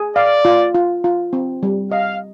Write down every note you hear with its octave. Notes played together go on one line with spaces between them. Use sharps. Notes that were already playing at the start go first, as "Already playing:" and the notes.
Already playing: G#4
D5 F5
F4
F4
F4
C4
G3
D#5 F5